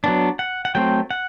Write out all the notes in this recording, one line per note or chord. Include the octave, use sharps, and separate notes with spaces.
F#3 B3 D4
F#5
F#5
F#3 A3 C4 G5
F#5